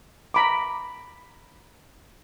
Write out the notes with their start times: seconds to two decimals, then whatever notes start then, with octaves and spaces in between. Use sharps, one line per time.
0.34 A#5 B5 D6